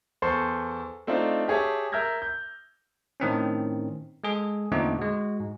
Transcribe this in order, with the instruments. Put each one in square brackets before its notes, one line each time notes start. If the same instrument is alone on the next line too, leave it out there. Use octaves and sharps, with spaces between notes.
[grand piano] E2 A4 C5 C6 C#6 C7
A3 C4 D4 D#4 F4
G4 G#4 C#5 E5 A5
A#4 E5 F6 G6 G#6 A#6
G6
[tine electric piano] A2 D#3 C4 C#4
G#3 G#4 A4
E2 A#2 D3 A3 C4 D#4
G#3 F#4
G#2